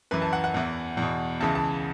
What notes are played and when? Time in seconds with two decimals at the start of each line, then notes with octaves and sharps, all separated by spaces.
0.11 F#2 E3 B4
0.22 A5
0.33 F#5
0.44 F#5
0.54 E2 E3
0.97 E2 B2
1.40 C#2 C#3 E3 A5
1.55 A5